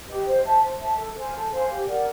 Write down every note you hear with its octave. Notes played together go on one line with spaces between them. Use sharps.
G4 B4 D#5
C5
E5 A5
C5
E5 A5
A4
C5 F5 G#5
A4
C5 F5 G#5
G4
A#4 D5 F#5